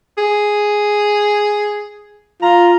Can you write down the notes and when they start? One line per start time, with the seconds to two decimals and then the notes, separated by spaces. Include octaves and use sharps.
0.18 G#4
2.42 F4 A#5